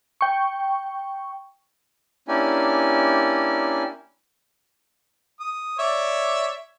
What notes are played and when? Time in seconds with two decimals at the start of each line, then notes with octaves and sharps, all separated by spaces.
0.21 G5 C#6
2.28 A#3 C#4 D4 E4 G4 G#5
5.40 D#6
5.79 C#5 D5 E5